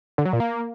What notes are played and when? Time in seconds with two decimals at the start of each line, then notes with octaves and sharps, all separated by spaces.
0.18 D3
0.25 F#3
0.33 A#2
0.40 A#3